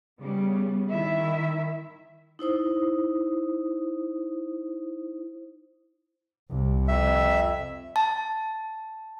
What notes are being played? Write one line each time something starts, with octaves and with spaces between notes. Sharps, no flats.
C#3 G3 B3
D#3 E4 E5
D#4 E4 C5 D#6
C2
F2 E5
A5